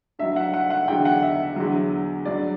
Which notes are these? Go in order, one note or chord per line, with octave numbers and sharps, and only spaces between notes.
G2 F#3 E5
F#5
F#5
F#5
E2 D3 F#3 G5
F#5
E5
E2 D3 F#3
G2 F#3 D5